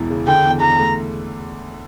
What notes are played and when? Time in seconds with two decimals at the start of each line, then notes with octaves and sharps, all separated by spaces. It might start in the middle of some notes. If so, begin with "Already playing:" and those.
Already playing: E1 E2 E3
0.10 C#3
0.27 D3 G5
0.44 E2
0.61 E2 A#5
0.79 A3